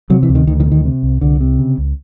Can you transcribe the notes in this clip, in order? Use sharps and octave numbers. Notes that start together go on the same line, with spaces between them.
C3 F#3
E3
D2
D#3
D2 D#3
D#3
C3
D#3
C3
C2
C2 D3
C3
C#3
C#2